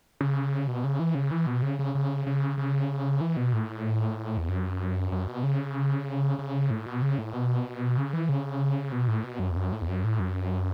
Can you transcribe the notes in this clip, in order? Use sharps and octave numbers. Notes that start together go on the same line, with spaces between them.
C#3
B2
C#3
E3
C#3
E3
B2
C#3
C#3
C#3
C#3
C#3
E3
B2
A2
E2
F#2
F#2
B2
C#3
C#3
A2
B2
C#3
A2
B2
C#3
E3
C#3
B2
A2
B2
F#2
E2
F#2
A2
E2
F#2
A2
F#2